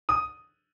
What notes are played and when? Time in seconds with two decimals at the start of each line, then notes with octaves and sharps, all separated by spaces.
0.09 D#6